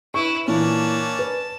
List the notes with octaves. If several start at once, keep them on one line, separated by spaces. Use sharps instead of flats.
E4 B4 C#6
A#2 E3 A#3 C#4 D4 A5
B4